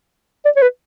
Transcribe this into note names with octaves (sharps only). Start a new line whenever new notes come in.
D5
C#5
B4